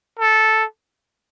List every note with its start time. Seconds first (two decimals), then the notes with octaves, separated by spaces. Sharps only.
0.19 A4